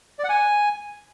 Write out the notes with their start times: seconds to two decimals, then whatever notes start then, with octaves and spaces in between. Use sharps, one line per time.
0.19 D5
0.24 F#5
0.29 G#5